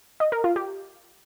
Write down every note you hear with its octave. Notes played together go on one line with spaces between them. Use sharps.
D#5
A#4
F4
G4